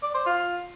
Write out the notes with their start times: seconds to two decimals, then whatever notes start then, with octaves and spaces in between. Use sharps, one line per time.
0.03 D5
0.14 C5
0.26 F4